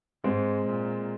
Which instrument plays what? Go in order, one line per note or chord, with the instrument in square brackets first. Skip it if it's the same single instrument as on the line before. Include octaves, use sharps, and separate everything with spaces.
[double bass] G#2 [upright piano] G#3 C4
[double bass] A#2